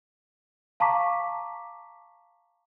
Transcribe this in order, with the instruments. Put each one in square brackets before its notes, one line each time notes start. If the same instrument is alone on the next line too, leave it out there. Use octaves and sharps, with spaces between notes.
[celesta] F5 A5 A#5 C#6 D6 B6